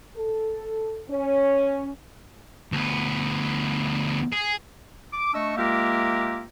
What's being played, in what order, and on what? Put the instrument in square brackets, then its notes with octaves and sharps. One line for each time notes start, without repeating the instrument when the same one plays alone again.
[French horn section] A4
C#4
[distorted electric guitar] D2 B3
G#4
[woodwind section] D6
A3 D4 D#5 C#6 E6
G#3 A#3 F4 G4 A#4 E5